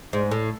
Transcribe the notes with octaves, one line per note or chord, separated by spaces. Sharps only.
G#2
A2